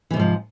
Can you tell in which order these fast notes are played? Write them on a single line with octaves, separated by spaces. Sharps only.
E3 C3 G#2 F3